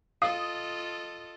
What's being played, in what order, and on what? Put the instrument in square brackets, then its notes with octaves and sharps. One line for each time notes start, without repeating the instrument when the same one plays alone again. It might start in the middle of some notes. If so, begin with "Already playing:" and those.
[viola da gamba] F4 A4 D#5 [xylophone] F5 [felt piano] D#6